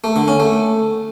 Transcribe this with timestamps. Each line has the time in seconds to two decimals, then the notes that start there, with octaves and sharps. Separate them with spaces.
0.04 A3
0.16 D3
0.28 C#4
0.40 A3